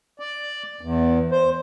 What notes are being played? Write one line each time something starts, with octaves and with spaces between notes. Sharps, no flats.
D5
E2
C5